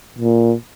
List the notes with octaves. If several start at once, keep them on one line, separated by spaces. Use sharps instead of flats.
A#2